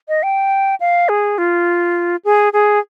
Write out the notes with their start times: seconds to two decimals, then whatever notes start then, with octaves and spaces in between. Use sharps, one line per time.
0.09 D#5
0.23 G5
0.80 F5
1.09 G#4
1.38 F4
2.25 G#4
2.53 G#4